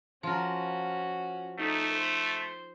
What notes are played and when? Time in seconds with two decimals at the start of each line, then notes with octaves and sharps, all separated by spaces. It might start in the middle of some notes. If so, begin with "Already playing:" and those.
0.23 F3 C#4 F#4 A#4
1.58 A3 D#4 A4
1.93 C5